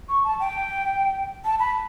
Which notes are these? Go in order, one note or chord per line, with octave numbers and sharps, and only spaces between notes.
C#6
A5
G5
A5
B5